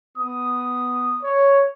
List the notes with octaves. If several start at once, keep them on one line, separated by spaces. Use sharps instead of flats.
B3 D#6
C#5